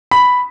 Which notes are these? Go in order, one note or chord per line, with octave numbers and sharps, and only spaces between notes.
B5